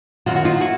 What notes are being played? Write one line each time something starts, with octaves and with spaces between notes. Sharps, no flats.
F#2 D#3 F#3 F4
F#4
D#4 F4
E4 F#4